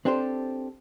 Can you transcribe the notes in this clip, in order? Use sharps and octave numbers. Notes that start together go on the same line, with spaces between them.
C4 D4 G4 A4 C5